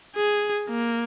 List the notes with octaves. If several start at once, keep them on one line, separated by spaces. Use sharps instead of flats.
G#4
A#3